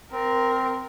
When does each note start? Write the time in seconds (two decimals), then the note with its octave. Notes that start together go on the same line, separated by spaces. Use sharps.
0.12 C4 A#4